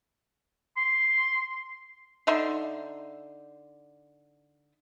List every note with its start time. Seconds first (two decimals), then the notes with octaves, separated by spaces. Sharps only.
0.77 C6
2.27 D3 D#4 E5 C6